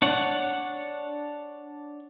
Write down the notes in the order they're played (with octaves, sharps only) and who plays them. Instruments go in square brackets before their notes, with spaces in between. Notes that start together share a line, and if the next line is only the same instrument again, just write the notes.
[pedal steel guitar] D4 C#5 F#5